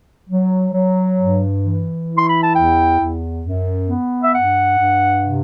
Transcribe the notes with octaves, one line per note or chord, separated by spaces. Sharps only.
F#3
F#3
G2
E3
E4
C6
B5
A5
E2 G5
E2
F#2
B3
E5
G2 F#5
G2
C3